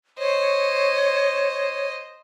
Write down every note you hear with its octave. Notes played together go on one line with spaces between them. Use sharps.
C5 C#5 D#5